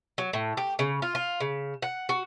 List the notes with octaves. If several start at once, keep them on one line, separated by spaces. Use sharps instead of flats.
F#3
A2
G4
C#3
F4
F4
C#3
F#5
F#4